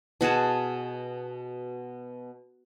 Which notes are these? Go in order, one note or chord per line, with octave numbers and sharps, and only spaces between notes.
B2 F#4 G#4 A5